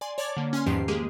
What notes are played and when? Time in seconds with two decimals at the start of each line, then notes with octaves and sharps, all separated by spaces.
0.01 D5 G#5 C6
0.18 C#5 D5 A5 D6 G#6 A6
0.37 D3 A#3
0.53 C#4 G#5 C6 F6
0.66 E2 G#2 D#3 F3 G4 C7
0.88 G#3 A#3 G4 G#4